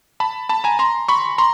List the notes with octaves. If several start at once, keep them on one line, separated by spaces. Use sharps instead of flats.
A5 B5
A5 B5
G#5 A#5
A#5 C6
B5 C#6
A#5 C6